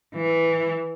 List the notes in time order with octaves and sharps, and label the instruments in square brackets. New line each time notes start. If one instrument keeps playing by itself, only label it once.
[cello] E3